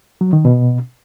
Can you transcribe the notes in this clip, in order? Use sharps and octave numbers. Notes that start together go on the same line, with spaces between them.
F#3
D#3
B2